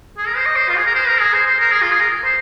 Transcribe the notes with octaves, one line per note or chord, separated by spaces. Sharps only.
G#4
A#4
C5
D#5
C5
F4
G#4
A#4
C5
A#4
G#4
C5
C5
A#4
G#4
F4
G#4
A#4
C5